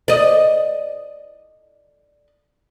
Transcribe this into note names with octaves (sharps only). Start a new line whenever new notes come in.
D5 D#5